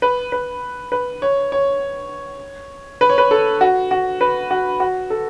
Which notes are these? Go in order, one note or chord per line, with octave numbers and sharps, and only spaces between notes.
B4
B4
B4
C#5
C#5
B4
C#5
B4
A4
F#4
F#4
B4
F#4
F#4
A4